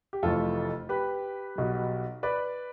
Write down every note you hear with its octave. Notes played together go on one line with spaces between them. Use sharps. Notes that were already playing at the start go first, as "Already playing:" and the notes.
G4
F1 F2 E3 A3 F4 A4
G4 B4
B1 B2 G3
B4 D5